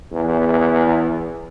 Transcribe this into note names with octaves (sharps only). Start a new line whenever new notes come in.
E2